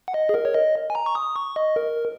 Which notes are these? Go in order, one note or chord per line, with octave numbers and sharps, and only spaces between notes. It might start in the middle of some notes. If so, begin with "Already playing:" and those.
F#5
D#5
G#4
A#4
C#5
D#5
G#5
A#5
C#6
D#6
C#6
D#5
A#4